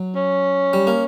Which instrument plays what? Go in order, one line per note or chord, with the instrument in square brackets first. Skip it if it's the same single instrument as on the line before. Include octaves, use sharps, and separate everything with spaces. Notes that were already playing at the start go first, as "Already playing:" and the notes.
Already playing: [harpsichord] F#3
[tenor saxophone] C#4
[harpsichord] G3
A#3